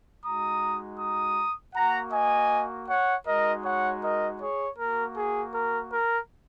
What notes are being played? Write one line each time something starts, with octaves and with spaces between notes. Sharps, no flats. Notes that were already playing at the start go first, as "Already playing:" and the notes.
G#3 D#4 F#4 A#5 D#6
A#5 D#6
A#3 F#4 F#5 A#5
D#5 G#5
C#5 F#5
G#3 D#4 F#4 A#4 D#5
C#5 F#5
A#4 D#5
G#4 C#5
A#3 F#4 A#4
G#4
A#4
A#4